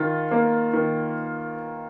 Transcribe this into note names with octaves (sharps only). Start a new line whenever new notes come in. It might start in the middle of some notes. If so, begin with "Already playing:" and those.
Already playing: D#3 F4
A#3
D#3